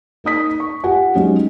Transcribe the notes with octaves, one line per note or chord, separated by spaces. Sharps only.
A#3 D#4 D#6 B6
C#6
F4 G4 F#5 G#5
F#3 G#3 C#4 D#4 G4